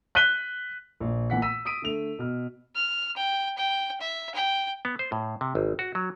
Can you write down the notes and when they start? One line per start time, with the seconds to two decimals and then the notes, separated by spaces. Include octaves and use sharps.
0.15 F#6 B6 D#7 G7
1.00 A#1
1.30 A#2 E3 F#5 B6
1.42 E6 B6 D#7
1.65 D#6 B6 D7 D#7
1.82 D3 A3 F7
2.19 B2 F6
2.75 F6
3.16 G5
3.57 G5
4.01 E5
4.34 G5
4.85 B3
4.99 C5
5.12 A2
5.41 C3
5.55 G#1
5.79 F#4
5.95 F#3